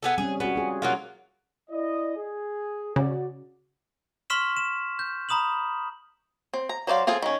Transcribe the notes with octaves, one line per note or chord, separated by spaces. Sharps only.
B3 G#4 A4
G3 C4 C#4 G#4
B3 F#4 G#4
F4 G#4
F#3 A#3 F4
E4 D5 D#5
G#4
C#3 F#4 D5
C6 C#6 F6 B6 E7 F#7
E7
G6
A#5 B5 D#6 E7 F#7
C4
A#5
F#3 C5 D5 F5
C4 F4 G#4 A4
D#3 C#4